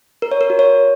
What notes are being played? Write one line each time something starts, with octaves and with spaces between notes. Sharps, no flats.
A#4
C#5
A#4
F#4
C#5